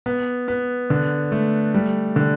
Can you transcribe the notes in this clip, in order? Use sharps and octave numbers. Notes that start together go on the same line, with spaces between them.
B3
B3
D3
A3
G3
D3